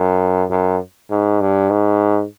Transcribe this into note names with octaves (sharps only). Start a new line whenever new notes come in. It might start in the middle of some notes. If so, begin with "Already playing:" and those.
Already playing: F#2
F#2
G#2
G2
G#2